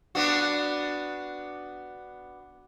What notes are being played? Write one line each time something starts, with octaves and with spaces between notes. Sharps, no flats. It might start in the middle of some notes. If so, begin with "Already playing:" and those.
B3 D4 F#4